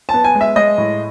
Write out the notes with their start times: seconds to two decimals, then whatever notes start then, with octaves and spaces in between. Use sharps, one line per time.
0.09 B3 A5
0.24 G#5
0.35 G#3
0.41 E5
0.56 G#3 D#5
0.78 A2